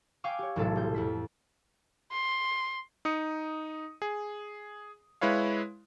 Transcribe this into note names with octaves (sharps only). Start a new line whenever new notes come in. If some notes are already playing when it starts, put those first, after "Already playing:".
F5 G5 G#5 C#6 D6 E6
G4 C#5
E1 B1 A2 C3 A4 E6
C2 G6
F2 E4 B6
C6
D#4 D#6 C#7
G#4
G#3 E4 B4 C#5 F5